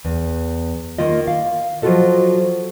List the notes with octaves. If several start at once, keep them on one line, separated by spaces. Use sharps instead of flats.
E2
D#3 A#3 F4 D#5
F5
F3 F#3 F4 F#4 A4 D#5